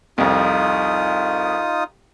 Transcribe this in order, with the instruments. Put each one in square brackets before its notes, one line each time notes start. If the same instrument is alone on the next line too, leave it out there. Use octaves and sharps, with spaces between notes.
[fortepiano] C2 F2 [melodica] D#4 F4 D#6